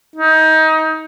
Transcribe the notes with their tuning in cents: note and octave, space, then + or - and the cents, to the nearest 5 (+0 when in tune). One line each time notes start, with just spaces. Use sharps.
D#4 +25